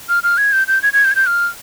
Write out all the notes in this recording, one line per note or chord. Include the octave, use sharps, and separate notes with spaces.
F6
F6
G#6
G6
G6
G#6
G#6
G6
G#6
G6
F6